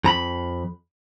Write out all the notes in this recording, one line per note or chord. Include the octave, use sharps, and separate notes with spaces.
F2 A#5 B5